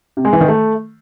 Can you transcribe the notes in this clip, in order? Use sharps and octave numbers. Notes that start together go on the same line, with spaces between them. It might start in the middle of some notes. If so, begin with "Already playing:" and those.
C3
G#3
E3
D#3
A3